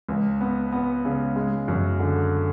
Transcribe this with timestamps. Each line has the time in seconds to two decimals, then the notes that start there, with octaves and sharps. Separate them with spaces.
0.09 C#2
0.41 B3
0.72 B3
1.05 C#3
1.36 G#3
1.68 F#2
2.00 D3